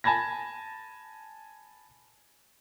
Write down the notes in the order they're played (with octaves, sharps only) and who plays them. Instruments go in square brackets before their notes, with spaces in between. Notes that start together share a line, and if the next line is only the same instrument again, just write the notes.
[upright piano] G#5 A5 B5 G#6 A#6